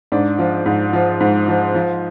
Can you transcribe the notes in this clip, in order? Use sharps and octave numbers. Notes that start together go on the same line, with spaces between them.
G#2 D4
F3
G#2
F3
G#2
F3
F3